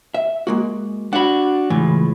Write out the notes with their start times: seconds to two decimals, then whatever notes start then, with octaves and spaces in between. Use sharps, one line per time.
0.14 E5
0.47 G#3 A#3 F#4
1.13 D4 F#4 F#5 B5
1.70 C#2 A2 E3